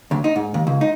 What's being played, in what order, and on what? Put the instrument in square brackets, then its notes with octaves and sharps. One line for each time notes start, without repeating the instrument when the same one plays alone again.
[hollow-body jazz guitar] D2
D#4
G#2
D#2
C#2
D#4